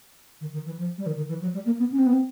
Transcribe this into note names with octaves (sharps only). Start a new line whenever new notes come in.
D#3
D#3
E3
F3
G3
D#3
D#3
E3
F#3
G3
A#3
B3
C#4
C4
B3
C4